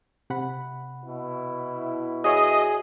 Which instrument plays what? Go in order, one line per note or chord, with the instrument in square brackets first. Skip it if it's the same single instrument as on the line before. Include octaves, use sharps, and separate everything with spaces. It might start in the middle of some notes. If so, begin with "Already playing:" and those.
[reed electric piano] C3 F#5 B5
[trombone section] B2 E4
[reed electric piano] F#4 C#5 E5 [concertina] G#4 [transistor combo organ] D#5